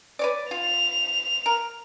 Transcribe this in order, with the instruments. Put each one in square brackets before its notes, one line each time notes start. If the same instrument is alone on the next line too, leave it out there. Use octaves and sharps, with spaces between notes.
[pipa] B4 C#5 D5
[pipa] F4 [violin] F7
[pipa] A#4